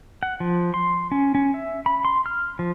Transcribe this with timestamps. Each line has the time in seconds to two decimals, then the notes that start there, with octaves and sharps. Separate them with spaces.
0.23 F#5
0.40 F3
0.74 C6
1.12 C#4
1.35 C#4
1.54 E5
1.86 B5
2.05 C6
2.26 F6
2.59 F3